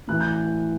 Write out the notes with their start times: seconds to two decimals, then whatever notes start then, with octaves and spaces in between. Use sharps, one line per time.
0.08 A2 E3 F#6
0.21 G6